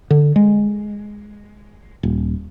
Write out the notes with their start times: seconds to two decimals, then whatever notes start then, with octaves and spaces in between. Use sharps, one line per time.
0.10 D3
0.36 G#3
2.03 D#1